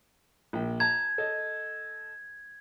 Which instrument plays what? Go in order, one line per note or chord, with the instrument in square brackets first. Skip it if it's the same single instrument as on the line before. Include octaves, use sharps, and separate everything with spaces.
[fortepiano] A#1 G5
[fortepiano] A5 A#5 [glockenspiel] G#6
[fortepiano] A4 D#5